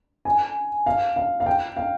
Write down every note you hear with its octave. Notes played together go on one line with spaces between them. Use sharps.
G#5
F5
F5
F5
G5
F5